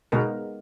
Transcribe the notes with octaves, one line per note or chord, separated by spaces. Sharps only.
B2 G#3 B3 D#4 A#4